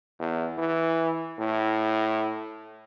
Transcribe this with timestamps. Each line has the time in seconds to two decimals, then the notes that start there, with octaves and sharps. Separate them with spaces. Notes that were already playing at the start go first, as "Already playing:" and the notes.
0.19 E2
0.59 E3
1.39 A2